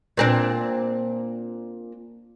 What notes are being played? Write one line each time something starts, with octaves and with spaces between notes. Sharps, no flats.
A#2 C4 D4